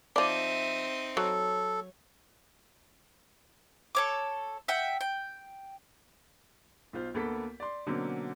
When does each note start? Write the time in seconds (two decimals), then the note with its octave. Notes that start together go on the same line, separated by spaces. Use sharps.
0.16 F3 C4 D#4 D5 E5 D#7
1.17 F#3 A4 C#5
3.95 A4 C#5 D6
4.68 E5 F#5 G5
5.01 G5
6.93 B1 F4 C5
7.14 D2 A#3 B3 A4 F#5 B6
7.60 D5 C6
7.86 B2 D3 F#3 A#3 C4 C#4